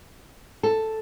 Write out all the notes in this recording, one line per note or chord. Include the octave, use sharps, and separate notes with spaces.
A4